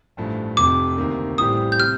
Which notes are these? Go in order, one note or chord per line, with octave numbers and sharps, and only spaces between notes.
A1 G2 F3 A3
F1 F2 C3 D6
D2 C3 D#3 A#3
A1 A2 G3 C4 G4 D#6
G6
C3 F6